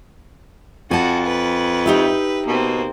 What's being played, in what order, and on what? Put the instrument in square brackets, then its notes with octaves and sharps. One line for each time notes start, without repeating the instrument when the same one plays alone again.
[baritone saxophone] F2 [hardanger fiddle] F#4 [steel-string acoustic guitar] G#5 A5
[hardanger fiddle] B4
[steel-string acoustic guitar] D#4 G4 E5
[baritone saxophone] B2 [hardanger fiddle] A#3 C4